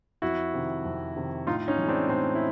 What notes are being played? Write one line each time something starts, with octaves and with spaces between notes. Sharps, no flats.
F2 E4 F#4
C3 D#3
F2
C3 D#3
A2 D#4 F4
C#4 D#4
E3 G#3
C4 D4
A2 C4 D4
E4